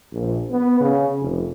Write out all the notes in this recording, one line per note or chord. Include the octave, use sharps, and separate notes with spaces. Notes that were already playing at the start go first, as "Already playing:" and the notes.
A#1
B3
C#3
F1